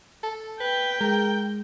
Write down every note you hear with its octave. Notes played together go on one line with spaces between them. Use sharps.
A4
B4 G5
G#3 A#4